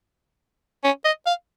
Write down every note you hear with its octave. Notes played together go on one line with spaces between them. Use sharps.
C#4
D#5
F5